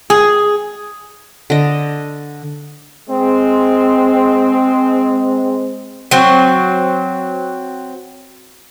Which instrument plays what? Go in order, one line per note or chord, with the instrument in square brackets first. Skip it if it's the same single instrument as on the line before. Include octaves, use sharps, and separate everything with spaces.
[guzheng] G#4
[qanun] D3 D#5
[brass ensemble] G#3 C4
[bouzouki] F#3 C4